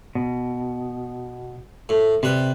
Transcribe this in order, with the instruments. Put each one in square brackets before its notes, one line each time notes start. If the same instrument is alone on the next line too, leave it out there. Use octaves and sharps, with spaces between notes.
[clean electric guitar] B2
[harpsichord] A2
[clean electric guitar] C3 [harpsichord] G3 B4